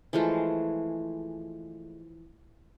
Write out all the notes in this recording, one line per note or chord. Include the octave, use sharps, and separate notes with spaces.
E3 F3 G#3 A3